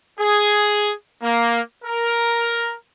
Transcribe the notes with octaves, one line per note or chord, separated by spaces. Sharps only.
G#4
A#3
A#4